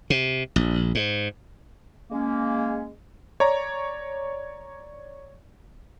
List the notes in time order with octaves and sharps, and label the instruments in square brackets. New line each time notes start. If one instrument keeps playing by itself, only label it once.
[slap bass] C3
A#1
G#2
[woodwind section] G#3 A#3 C#4
[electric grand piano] C#5 D5 A#5